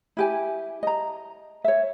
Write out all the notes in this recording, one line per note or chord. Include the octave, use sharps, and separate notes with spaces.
E4 G4 G#5
D#5 A#5
C#5 E5